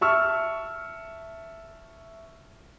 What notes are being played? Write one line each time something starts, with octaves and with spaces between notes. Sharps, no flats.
E5 A5 C#6 E6 F6